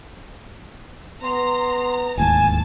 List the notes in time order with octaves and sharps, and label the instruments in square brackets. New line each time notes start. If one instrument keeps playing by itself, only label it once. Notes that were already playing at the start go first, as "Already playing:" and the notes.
[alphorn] B3 [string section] A#5 [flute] C6
[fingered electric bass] D1 D#2 G#2 [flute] G#5 [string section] A5